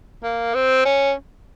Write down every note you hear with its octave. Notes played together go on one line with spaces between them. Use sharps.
A#3
C4
C#4